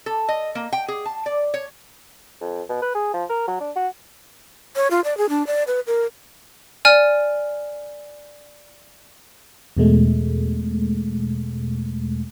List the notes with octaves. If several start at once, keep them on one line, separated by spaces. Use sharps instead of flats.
A4
D#5
A#3
G5
G#4
A5
D5
C#5
F2
B2
B4
G#4
F3
A#4
F#3
D4
F#4
C#5
F4
D5
G#4
D4
D5
B4
A#4
D5 G#5 F6
E2 B2 G#3 A3